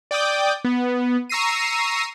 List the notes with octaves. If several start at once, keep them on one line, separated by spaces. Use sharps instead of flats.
D5 G5 D6 D#6 G6
B3
A#5 C#6 E6 A#6 C7 D#7